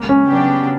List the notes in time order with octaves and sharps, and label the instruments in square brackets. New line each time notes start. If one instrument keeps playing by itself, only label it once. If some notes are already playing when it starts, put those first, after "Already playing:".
Already playing: [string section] C#2 A#3
[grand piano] C#4
[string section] C#3 F#3 B3 D4 G4